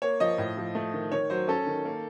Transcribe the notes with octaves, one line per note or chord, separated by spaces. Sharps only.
A#3 C#5
F3 D#5
A2
F3
A3
D#3
D#3 C#5
F#3 C5
C#4 A4
D#3
A#3